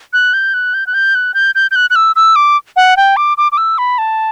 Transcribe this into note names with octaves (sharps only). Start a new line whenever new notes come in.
F#6
G6
F#6
G6
F#6
G6
F#6
G6
G6
G6
F#6
F#6
E6
E6
D6
F#5
G5
D6
D6
D6
E6
B5
A5